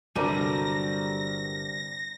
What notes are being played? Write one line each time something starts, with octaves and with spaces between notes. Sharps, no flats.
G1 C3 F#3 G3 A4 A#4 A#6 D#7